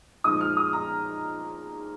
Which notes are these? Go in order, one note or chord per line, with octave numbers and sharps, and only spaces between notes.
A#2 F3 G#3 D#4 D#6
F6
D#6
A#5